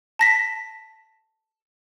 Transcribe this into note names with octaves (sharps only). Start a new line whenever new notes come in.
A5 A#6 B6